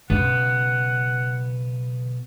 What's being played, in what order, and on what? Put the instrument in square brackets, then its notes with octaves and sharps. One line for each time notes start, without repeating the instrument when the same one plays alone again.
[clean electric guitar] B1 B3 [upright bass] C#3 [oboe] F#5